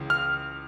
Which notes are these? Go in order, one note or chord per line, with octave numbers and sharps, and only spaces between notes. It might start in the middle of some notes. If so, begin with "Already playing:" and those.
Already playing: C#2 C#3 E3
F6